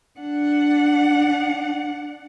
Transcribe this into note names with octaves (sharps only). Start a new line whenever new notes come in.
D4 F#5